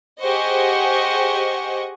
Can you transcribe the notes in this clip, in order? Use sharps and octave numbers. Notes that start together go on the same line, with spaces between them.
G4 G#4 C5 D#5 F#5 C#6